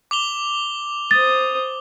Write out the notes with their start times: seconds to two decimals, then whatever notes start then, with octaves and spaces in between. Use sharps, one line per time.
0.11 D6 F7 G7
1.11 C5 D#6 A6